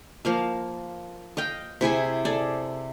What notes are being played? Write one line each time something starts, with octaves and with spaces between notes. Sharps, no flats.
F3 A#3 F5
D#5 F5 G5
C3 E4 G#4 G#5
G#4 A4 D5